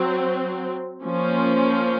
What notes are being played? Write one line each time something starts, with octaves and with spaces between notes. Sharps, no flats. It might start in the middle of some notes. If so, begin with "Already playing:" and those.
Already playing: F#3 C4
F3 A#3 C#4